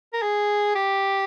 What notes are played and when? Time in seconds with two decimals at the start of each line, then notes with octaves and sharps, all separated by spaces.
0.13 A#4
0.22 G#4
0.75 G4